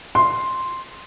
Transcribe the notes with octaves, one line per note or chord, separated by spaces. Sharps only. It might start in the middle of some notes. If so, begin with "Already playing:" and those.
C6